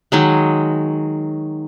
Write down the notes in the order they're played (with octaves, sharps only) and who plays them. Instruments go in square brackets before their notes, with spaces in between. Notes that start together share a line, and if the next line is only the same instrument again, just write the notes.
[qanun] D#3 F#3 G#3